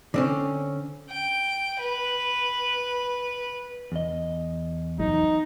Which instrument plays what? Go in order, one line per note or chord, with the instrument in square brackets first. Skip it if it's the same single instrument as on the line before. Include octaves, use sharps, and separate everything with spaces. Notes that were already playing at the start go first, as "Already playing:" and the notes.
[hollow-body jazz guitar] D3 C4 C#4
[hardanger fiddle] G5
B4
[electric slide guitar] E2 D#5
[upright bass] F#3 [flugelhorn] D#4